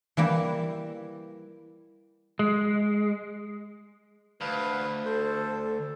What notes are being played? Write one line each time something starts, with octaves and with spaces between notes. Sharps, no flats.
E3 G3 A#3 E4
G#3
D2 B4 F5
A4 C5